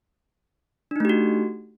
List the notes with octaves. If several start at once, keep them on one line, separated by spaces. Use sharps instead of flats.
A3 D4 D#4 F#4 G4